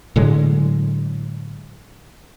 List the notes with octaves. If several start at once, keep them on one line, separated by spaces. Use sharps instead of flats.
A2 D3 F#3 G#3